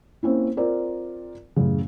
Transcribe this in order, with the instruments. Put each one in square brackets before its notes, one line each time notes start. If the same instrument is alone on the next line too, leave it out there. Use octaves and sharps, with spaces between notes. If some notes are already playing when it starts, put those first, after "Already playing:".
[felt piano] A#3 C4 C#4 E4
C4 F4 A#4 D5
A1 F#2 C#3